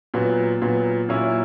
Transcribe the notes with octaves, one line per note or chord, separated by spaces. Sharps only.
A#2 F#3 B3
A#2 F#3 B3
A#2 F#3 A#3 C#4 E4